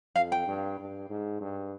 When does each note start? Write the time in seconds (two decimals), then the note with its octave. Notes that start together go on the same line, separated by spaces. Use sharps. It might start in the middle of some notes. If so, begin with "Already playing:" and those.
0.16 F2 F5
0.32 G5
0.47 G2
0.79 G2
1.10 G#2
1.41 G2